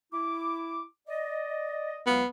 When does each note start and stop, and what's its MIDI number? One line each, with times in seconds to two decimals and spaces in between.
0.12 0.82 64
0.12 0.82 86
1.07 2.01 74
1.07 2.01 75
2.06 2.21 37
2.06 2.21 54
2.06 2.27 59
2.06 2.21 77